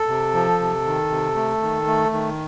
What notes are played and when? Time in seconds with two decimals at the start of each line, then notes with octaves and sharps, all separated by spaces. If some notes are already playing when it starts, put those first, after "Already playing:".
Already playing: A4
0.08 C3
0.34 F3
0.60 C3
0.86 D#3
1.11 C3
1.36 A3
1.62 D#3
1.87 A3
2.13 D#3